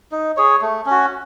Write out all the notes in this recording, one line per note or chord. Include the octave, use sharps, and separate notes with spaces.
D#4
G#4 C#5
A3
C#4
F#4